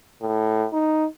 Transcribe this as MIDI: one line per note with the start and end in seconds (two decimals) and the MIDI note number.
0.22 0.67 45
0.73 1.05 63